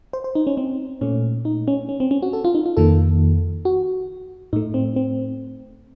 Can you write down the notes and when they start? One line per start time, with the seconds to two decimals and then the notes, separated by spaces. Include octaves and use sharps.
0.13 C5
0.24 C5
0.35 D#4
0.47 C#4
0.57 C4
1.01 A#2 A3 C#4
1.45 D#4
1.68 C#4
1.89 C#4
2.00 C4
2.11 C#4
2.22 F#4
2.33 A4
2.45 F4
2.55 D#4
2.66 F4
2.77 F2 D#3 A#3 A4
3.65 F#4
4.53 A2 D#4
4.56 A3
4.74 C4
4.96 C4